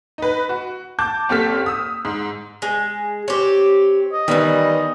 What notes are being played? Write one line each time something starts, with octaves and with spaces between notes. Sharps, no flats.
D#4 B4
F#4
A5 D6 G6
F#1 C4 G4 A4 F6 B6
D#6 E6
G#2
G#3
C4 G4 C#5
D#5
D#3 E3 G3 B3